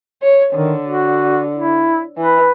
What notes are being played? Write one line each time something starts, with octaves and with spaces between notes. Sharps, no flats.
C#5
D3 D#3
F#4
E4
E3 B4